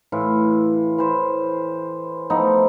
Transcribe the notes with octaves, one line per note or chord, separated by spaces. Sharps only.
A2 E3 F4
E3 C5
F3 A3 B3 D#4